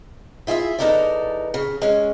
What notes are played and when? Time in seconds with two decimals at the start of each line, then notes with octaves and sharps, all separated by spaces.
0.47 E4 F4 G#4 D#5 E5
0.78 E2 B3 D#4 A4 A#4 D5
1.54 C#3
1.82 G#3 C#4